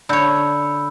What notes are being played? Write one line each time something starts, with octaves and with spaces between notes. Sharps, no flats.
D3 C#5 B5 E6 G6